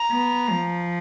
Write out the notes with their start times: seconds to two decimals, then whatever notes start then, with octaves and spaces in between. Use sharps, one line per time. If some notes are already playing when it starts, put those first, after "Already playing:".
Already playing: A#5
0.11 B3
0.50 F3